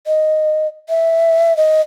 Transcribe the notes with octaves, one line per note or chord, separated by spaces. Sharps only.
D#5
E5
D#5